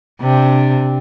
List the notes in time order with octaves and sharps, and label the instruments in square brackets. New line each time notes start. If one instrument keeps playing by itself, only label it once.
[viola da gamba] C3 D4